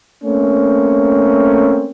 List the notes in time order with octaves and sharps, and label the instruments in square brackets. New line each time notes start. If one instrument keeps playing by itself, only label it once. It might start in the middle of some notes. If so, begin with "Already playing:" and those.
[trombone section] A3 A#3 C4 C#4